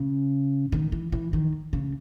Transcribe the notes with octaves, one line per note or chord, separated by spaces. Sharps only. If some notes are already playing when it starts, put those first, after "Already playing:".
Already playing: C#3
D#3
E3
E3
D#3
C#3